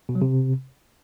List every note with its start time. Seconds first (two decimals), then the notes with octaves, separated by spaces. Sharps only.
0.09 B2
0.15 F#3
0.22 C3